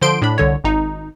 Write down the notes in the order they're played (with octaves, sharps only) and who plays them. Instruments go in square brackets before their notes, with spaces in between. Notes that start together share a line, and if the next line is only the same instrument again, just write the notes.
[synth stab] D3 F3 C5 C6 D7
A2 D4 B5
C2 D3 C#5
G#1 D#4